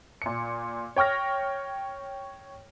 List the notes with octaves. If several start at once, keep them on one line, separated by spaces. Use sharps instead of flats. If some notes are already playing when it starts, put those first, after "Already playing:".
A#2 C#7
C#5 G5 C#6 F6 A#6